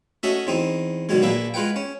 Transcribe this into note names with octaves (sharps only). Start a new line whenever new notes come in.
A3 C#4 F#4 D#5 E5
E2 C4 D#4
B2 D3 D#3 F#3 G#3
A#1 A#3 D4 B4 E5
G#3 F4 B4 F#5 G5
C#4